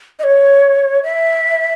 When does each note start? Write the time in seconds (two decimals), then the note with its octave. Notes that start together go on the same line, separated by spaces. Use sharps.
0.19 D#5
0.24 C#5
1.03 E5